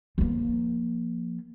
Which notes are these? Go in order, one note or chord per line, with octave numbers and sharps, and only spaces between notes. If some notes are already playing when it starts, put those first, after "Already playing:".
F3 A#3